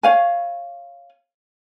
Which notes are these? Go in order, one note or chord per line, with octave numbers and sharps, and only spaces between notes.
C#5 F5 G#5